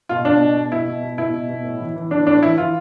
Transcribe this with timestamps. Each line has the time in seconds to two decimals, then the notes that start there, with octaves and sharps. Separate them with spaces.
0.09 B2 F4
0.25 B2 D4
0.40 B2
0.56 B2
0.71 B2 E4
0.87 B2
1.03 B2
1.18 B2 E4
1.34 B2
1.49 B2
1.64 A2
1.81 E3
1.96 E3
2.11 E3 D4
2.27 A2 D4
2.42 E3 E4
2.58 E3 F4